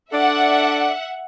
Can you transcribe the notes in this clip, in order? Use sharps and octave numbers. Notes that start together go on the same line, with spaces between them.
D4 A4 D5 E5 F#5